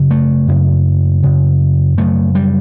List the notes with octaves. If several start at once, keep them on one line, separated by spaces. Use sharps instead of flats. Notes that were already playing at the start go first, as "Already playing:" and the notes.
Already playing: F#2 C#3
A3
F#2 C#3
F#2 C#3
F#2 C#3 A3
G3